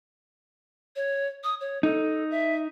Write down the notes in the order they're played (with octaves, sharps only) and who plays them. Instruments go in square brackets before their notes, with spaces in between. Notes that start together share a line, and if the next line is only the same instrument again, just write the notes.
[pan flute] C#5
D#6
C#5
[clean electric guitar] D#4 [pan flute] A4
[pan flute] E5